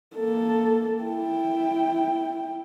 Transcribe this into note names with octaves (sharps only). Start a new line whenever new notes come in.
A#3 A4
E4 G5